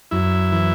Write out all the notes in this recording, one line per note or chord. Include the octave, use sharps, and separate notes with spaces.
F#2 E4
E3